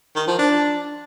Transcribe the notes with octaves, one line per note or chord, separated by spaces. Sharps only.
D#3
F3
D4